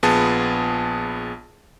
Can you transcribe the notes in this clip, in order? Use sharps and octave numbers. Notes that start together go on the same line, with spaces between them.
A#1 B3 F4 G#4 A5 D#6